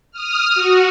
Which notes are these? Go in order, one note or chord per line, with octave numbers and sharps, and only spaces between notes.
D#6 F6
F#4